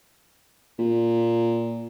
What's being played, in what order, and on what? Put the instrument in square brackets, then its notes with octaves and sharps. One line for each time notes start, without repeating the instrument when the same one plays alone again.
[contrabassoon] A#2